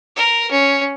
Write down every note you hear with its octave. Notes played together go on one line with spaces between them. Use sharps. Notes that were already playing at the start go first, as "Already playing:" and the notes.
A#4
C#4